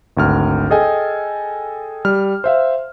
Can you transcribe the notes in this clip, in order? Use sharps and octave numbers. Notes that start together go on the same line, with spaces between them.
G#1 D2 F6
G#4 A4 D#5 G5 G#5
G3 F6
C5 E5 F5